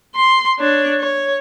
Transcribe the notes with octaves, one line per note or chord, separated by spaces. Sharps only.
C6
D4 C#5
C#5